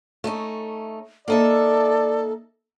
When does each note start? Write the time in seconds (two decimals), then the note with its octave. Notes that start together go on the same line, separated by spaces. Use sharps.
0.24 A3 C#4 D#4
1.28 A#3 D#4 A4 D5 E5